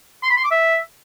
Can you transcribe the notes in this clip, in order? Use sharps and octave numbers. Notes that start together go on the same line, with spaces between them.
C6
B5
C6
D6
E5